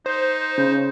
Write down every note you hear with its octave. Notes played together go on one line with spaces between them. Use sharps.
D#4 C5
C#3